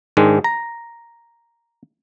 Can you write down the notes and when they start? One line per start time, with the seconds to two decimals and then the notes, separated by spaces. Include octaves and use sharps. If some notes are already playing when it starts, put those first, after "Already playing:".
0.17 G#2 D#3 G#3 D4
0.44 A#5